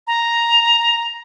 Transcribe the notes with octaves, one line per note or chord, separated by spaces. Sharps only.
A#5